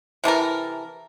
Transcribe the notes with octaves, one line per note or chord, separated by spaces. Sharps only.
C3 E3 A4 A#4